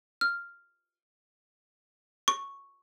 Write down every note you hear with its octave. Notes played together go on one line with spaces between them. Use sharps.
F6
C#6